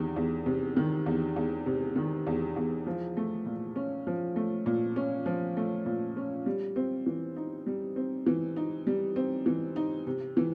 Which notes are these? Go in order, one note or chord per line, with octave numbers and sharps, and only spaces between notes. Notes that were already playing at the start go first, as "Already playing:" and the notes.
Already playing: E2 C3 D#3
E2
C3
D#3
E2
E2
C3
D#3
E2
E2
F3
A3
A#2
C#4
F3
A3
A#2
C#4
F3
A3
A#2
C#4
G3
C4
E3
D#4
G3
C4
E3
D#4
G3
C4
E3
D#4
C3
E3